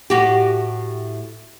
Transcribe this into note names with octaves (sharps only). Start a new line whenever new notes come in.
A2 F#4 G4